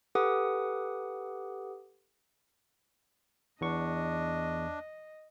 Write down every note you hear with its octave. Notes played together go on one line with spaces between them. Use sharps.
G4 A4 B4 F#5 D6 D#6
E2 D4 D#5 C#6